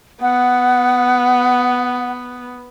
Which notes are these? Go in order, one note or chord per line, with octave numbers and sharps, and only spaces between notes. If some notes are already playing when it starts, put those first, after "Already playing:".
B3 F#5